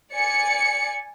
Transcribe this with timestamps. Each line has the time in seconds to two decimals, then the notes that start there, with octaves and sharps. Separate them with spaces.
0.12 D5 G#5 C#7